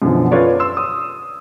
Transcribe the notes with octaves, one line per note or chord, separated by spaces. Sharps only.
F#2 B2 D3 E3 F3
C#4 F4 A4 B4 C#5 D5
C6 E6
D#6